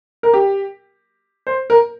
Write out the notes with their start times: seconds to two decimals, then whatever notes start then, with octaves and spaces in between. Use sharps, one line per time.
0.23 A#4
0.33 G4
1.47 C5
1.70 A#4